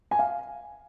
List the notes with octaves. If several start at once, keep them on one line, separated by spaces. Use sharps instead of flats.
G#5
F5